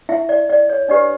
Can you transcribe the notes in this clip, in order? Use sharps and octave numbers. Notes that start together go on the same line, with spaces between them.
E4 E5
D5
D5
C#5
D4 G4 B4 D5